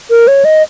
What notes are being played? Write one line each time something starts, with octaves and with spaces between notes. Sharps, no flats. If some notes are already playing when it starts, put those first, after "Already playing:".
A#4
C#5
D#5